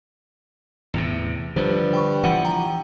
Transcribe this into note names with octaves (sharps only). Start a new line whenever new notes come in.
E2 A2 C3
G2 D3 F3 C5
G5 B5 C#6
E3 F3 F#5 C#7 D#7
G5 A#5